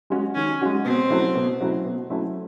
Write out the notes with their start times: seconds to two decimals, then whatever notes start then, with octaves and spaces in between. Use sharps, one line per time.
0.10 G#3 C#4 F#4
0.35 D#3 C#4
0.61 G#3 C#4 F#4
0.85 B2 C4
1.10 F#3 A3 C#4 E4
1.36 B2
1.60 F#3 A3 C#4 E4
1.85 B2
2.10 F#3 A3 C#4 E4